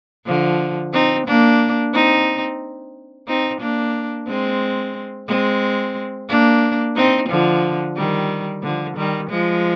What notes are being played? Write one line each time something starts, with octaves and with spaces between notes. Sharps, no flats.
D3 F3
C4 D#4
A#3 D4
C4 D#4
C4 D#4
A#3 D4
G#3 C4
G#3 C4
A#3 D4
C4 D#4
D3 F3
D#3 G3
D3 F3
D#3 G3
F3 G#3